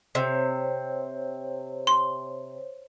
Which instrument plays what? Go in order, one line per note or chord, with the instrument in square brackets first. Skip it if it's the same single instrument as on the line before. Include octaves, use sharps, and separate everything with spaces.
[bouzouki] C3 [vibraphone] C5 C#5
[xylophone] C6